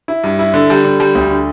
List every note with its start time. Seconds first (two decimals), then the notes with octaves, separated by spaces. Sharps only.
0.08 E4
0.24 G2
0.39 E4
0.54 D3
0.70 G3
0.85 D3
1.00 G3
1.15 D2
1.30 D3